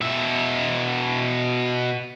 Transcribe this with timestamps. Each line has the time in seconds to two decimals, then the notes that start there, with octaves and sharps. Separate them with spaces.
0.01 B2 E5